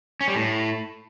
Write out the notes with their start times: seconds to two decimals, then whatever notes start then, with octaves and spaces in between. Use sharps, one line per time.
0.21 C#4
0.28 G3
0.35 A2